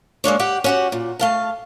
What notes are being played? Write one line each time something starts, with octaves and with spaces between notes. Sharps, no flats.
G#3 A#3 D4 C#5
G4 F#5 G5
C#4 F#4 G4
A#2
A3 F5 A5